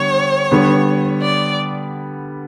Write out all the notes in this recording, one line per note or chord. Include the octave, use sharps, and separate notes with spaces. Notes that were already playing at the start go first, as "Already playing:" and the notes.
Already playing: D3 G3 B3 C#5
D3 G3 B3
D5